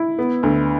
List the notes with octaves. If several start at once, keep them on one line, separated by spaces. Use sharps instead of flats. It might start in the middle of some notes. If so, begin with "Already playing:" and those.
Already playing: E4
B3
D2